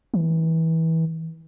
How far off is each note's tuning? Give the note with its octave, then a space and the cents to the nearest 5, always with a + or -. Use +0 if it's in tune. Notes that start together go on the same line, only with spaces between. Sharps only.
E3 -25